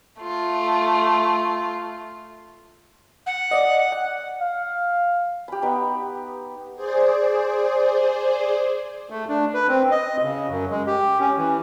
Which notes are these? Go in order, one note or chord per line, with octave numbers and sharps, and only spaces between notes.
A3 F4
F#5
D5 D#5
F#5
F5
G4 B5
B3 D#4 G4
G#4 C5 D5
A3
D4
B4
C4
D#5
C#3
F#2
G#3
G4
C#4
E3